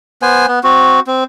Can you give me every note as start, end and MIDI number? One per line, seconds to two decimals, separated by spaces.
0.22 0.46 59
0.22 0.46 72
0.22 0.46 80
0.48 0.59 59
0.64 1.00 60
0.64 1.00 66
1.07 1.24 60